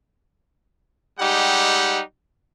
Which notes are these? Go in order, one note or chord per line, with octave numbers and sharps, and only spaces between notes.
G3 G#3 D#4 G4 F#5